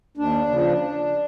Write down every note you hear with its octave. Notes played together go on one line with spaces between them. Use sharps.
D#2 D4
C#3 F3